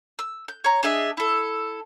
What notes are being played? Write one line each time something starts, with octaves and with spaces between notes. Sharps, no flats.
E6
G6
C#5 A#5
D4 G#4 D#5 E5
E4 A4